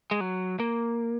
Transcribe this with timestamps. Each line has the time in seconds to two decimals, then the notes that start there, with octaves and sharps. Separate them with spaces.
0.11 G#3
0.21 F#3
0.60 A#3